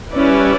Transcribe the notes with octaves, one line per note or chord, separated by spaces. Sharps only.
G3 C#4 E4 B4 D5